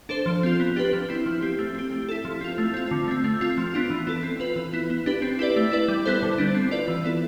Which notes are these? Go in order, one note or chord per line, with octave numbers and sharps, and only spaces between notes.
D4 A4 C5
F3
C4 F4
B3
D4 G4 B4
F3
C4 E4
F3
C4 G4
A3
C4 G4
A3
E4 A4
F3
C4 F4
A3
C4 F4
D3
A3 C4
A3
C4 F4
F3
B3 D4 F4
E3
B3 E4 A4
C4
F4 B4
E3
B3 E4
B3
D4 G4 B4
C4
E4 G4 B4 D5
A3
E4 B4 D5
G3
B3 E4 A4 C5
D3
G3 B3 D4
C4
F4 B4 D5
E3
B3 E4 A4